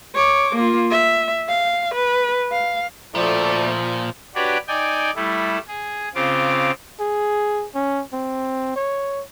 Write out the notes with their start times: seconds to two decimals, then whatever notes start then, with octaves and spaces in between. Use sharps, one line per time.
0.15 C#5 D6
0.55 A#3 F4
0.91 E5
1.49 F5
1.94 B4
2.52 F5
3.15 D2 A#2 F3 A3 D5
4.35 D4 F#4 G4 B4 C#5 D5
4.68 D#4 D5 G5 G#5
5.16 G3 A3 E4
5.68 G#4
6.15 C#3 C4 F4 D6
7.00 G#4
7.75 C#4
8.13 C4
8.76 C#5